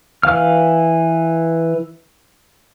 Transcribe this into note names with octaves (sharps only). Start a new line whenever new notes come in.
E3 F5 F6